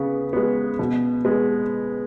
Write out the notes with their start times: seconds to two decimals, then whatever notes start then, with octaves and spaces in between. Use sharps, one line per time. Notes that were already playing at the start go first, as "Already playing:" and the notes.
Already playing: C#3 B3
0.33 G#3 B3
0.79 B2
1.25 G#3 B3